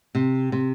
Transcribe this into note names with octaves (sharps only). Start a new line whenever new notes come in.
C3
C3